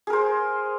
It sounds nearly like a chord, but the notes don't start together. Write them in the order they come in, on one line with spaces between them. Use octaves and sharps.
G#4 A#4 C5